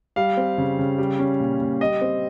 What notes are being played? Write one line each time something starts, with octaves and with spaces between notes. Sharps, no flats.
G3 F5
C4
C#3
C#3
G3
C#4
A#2
A#2
G3 D#5
C4